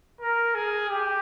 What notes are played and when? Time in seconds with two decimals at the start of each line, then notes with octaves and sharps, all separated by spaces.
0.21 A#4
0.55 G#4
0.89 G4